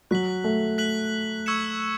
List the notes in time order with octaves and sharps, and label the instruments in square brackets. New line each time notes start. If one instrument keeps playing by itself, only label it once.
[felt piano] F#3 [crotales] F#6 B6 F#7
[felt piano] A3
[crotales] F#6 B6 F#7
C#6 E6 G#6 C#7 E7